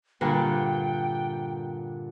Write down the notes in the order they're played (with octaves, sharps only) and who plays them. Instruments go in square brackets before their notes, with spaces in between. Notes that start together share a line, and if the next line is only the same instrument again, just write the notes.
[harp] G2 A#2 D3 [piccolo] G5